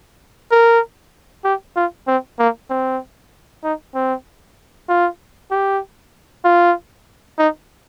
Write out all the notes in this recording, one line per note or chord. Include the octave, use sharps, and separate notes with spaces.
A#4
G4
F4
C4
A#3
C4
D#4
C4
F4
G4
F4
D#4